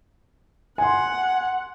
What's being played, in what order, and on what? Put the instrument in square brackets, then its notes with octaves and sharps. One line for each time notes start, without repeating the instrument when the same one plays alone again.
[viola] F#5 [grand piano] G#5 C6